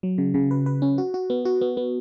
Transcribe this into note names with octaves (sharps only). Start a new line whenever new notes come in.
F#3
C#3
C#3
B4
B4
C#4
F#4
F#4
B3
F#4
B3
B3